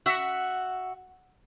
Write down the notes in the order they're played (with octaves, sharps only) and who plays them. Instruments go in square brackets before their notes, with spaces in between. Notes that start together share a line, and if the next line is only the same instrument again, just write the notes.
[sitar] F#4 E5